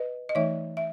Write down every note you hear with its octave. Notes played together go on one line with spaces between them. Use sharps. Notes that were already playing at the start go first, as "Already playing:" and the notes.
Already playing: B4 D#5
D#5
E3 A3 D#4 C#5 E5
E5